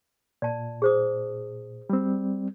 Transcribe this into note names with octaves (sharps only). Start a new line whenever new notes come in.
A#2 D5 A5
G#4 C5 D#6
G3 C4